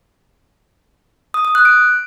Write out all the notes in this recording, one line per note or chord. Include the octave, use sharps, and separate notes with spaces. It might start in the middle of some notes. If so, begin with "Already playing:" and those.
D#6
D#6
F#6
D7